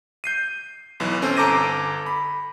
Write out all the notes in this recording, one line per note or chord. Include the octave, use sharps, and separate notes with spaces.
G6 C7 D#7
B1 E3
C4 C#4 A4 C5
G1 A4 A#5 D6 A#6 D#7
B5